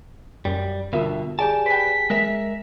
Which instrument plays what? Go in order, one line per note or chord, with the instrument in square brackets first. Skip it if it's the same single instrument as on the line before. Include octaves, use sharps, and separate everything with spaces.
[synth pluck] F#2 [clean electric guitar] G3
[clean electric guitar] G2 B2 [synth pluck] D3 E5 [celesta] F4 A#4
[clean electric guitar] G4 D5 A5 [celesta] G#4 G#5
[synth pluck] B4 G5 [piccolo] B6
[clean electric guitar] G#3 A#4 E5